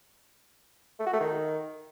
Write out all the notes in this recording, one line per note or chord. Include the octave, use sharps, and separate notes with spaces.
A3
F#4
A3
D#3